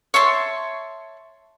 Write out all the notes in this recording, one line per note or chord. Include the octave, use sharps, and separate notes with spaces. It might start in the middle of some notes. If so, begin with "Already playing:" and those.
C#5 E5 A5 C6